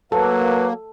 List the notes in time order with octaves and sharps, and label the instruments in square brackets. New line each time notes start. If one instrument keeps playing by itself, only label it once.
[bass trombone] F#3 [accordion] A#3 [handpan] A4 [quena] B4